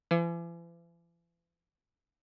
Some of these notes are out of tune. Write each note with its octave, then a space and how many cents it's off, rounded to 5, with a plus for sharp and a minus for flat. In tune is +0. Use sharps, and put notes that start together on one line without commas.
E3 +45